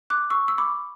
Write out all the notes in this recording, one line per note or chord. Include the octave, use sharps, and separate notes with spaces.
D6 F#6
C#6 E6
E6
B5 D6